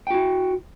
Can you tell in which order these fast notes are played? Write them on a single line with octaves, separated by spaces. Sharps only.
G5 F#4 E4